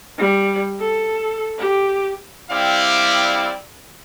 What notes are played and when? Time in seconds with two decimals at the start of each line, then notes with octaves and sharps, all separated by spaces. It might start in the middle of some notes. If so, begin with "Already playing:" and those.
0.18 G3
0.80 A4
1.58 G4
2.51 G3 C4 E4 D5 F5